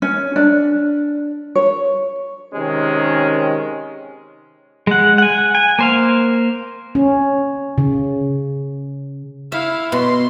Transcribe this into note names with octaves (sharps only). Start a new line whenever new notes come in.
C#4
D4
C#5
C3 D#3 G#3 C#4
G#3 F#5
F#5 G#5
G#5
A#3 C5 F5
C#4
C#3
E4 E5 F5
B2 C6